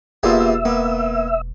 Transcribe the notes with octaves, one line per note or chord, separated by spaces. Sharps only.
E1 A#3 B3 F4 G4 G#4 D5 E5
A#3 B3